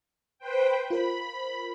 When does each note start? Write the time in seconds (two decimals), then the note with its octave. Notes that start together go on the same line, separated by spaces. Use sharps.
0.39 B4 C5 G5
0.90 F4 A#4 C5 B5